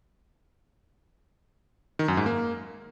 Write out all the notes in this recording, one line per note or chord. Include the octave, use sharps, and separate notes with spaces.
D#3
F#2
G#2
A#3